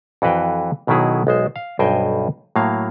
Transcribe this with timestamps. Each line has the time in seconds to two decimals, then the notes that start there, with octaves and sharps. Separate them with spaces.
0.22 F2 E3 F#4 B4 F5 G5
0.87 B1 B2 D#3 F#3 E4 G#4
1.27 B1 G#3 C5
1.56 F5
1.79 B1 G2 C5 D#5 G5 G#5
2.56 A2 F#3 A#3 F5